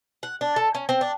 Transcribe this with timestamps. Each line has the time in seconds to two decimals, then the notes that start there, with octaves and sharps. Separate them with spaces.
0.23 F#5
0.41 D4
0.56 A4
0.75 C#4
0.89 C4
1.01 D4